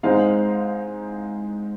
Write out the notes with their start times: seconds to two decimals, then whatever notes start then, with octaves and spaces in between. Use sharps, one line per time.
0.03 G#2 G#3 C4 D#4 F5